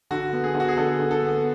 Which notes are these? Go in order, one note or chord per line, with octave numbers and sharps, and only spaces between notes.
D3 F#4
B3
G#4
D3
F#4
G#4
D3 A4
D3
A4
B3